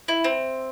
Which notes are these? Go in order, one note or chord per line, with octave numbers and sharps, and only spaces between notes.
E4
C4